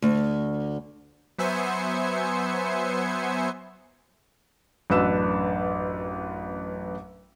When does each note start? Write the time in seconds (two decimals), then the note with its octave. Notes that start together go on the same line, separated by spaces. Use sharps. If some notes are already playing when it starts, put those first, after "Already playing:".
0.02 D2
1.39 F#3 B3 C5 E5 G#5 C#7
4.90 A1 F#2 D4 B4 E6 E7